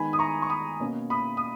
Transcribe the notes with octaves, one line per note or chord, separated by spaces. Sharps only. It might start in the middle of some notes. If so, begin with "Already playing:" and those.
Already playing: D#3 G#3 B3 G#5 B5
D#6
A#5 C#6
C#6
B5 D#6
B2 A#3 C#4
B5 D#6
D#6